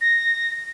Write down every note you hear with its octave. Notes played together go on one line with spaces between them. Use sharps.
A#6